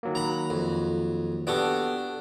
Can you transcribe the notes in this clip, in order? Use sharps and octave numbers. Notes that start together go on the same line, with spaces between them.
D#3 F#3 A#3
A#5 B5
F2
B3 D4 F#4 G4 A4